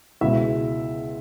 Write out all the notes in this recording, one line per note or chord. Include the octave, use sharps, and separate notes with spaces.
C#2 B2 G#3 E4 E5